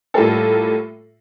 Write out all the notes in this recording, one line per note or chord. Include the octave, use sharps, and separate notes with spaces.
A2 G3 A#3 F4 A4